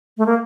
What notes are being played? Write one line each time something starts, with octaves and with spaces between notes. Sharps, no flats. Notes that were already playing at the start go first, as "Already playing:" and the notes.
A3
A#3